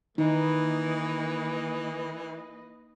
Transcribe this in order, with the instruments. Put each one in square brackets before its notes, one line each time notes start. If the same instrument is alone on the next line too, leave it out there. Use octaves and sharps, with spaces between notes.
[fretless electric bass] D#3 [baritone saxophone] E3 [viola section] A#3 B4 D#5 [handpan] D#4